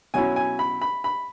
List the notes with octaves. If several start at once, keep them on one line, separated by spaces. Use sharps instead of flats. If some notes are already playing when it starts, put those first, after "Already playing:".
B2 F#3 C#4 E4 G#5
G#5
B5
B5
B5